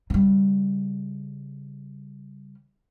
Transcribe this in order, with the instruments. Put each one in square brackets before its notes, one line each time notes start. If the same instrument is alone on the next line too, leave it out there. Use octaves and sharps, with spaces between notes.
[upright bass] C#3 G3